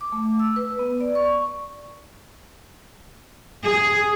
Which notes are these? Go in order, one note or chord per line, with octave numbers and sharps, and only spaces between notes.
D6
A3
E6
B4
B3
D5
C#6
G#4